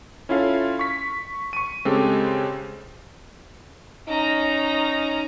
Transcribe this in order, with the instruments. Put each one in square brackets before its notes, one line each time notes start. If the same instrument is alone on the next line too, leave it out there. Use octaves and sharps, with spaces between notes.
[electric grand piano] C#4 E4 F4 A4 F5
C#6 B6
C#6 D#7
C#3 G#3 C4 G4 A4
[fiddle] C#4 A#5 [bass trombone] D#4